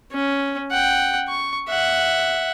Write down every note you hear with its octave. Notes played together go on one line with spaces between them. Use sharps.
C#4
F#5 G5
C#6
E5 F#5